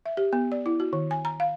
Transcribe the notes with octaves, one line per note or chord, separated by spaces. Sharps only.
E5
G4
B3
D5
E4
F#4
D#3
G#5
A#5
F5